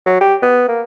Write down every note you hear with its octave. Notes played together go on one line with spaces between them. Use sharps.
F#3
G4
B3
A#3